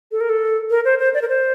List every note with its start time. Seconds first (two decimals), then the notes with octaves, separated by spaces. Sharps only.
0.12 A4
0.21 A#4
0.30 A4
0.70 A#4
0.85 C5
0.99 C5
1.14 D5
1.22 A#4
1.28 C5